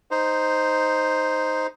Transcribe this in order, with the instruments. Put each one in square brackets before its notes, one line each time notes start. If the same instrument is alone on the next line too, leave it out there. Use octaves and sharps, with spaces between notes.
[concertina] D#4 C5